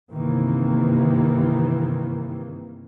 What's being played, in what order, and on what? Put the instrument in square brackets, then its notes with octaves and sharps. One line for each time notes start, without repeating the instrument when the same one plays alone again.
[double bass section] G1 C3 D#3 E3 A#3